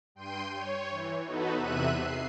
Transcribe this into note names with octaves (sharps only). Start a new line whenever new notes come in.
G2 G5 C6 G6 D#7
C#5
E3
B3 D#4 F#4 A4 B4
E2 C3 E5 F#6 D#7
C7